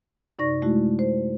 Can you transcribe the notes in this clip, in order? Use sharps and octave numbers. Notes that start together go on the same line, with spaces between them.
F#2 C3 D#4 D5 C#6 A#6
G#3 A3 E4 F#4
C5